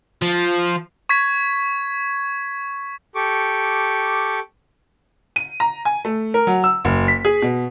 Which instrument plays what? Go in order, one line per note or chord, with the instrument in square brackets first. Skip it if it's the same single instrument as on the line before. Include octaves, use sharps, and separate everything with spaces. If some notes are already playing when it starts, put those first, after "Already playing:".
[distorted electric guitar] F3
[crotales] C#6 G#6 B6
[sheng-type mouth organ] G4 A4 C#6 D6
[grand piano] D#7
A#5
G#5
A3
A#4
F#3
E6
F#1
B6
G#4
B2